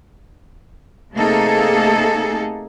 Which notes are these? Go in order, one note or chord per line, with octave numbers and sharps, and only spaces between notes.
C3 A3 A#3 D#4 G#4 A4